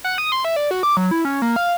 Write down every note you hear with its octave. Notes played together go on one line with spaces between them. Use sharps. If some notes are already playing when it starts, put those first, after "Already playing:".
F#5
D#6
C6
E5
D5
F#4
D6
F#3
E4
C#4
A#3
F5